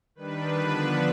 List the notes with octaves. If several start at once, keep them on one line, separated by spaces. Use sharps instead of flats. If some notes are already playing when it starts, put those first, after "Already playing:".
D#3 G3 D4 B4
D3 F3 B3 D4